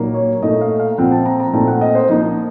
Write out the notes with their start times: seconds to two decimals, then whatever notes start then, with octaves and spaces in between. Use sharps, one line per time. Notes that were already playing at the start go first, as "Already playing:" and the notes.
Already playing: A#2 F#3 A#3 D#4
0.14 C#5
0.42 A#2 A3 D#4 D#5
0.61 F5
0.80 F5
0.98 A#2 F3 C4 F4 F#5
1.12 A5
1.26 A#5
1.40 A#5
1.53 A#2 A3 C4 D#4 A5
1.67 F#5
1.81 D#5
1.95 C5
2.09 F3 A#3 D#4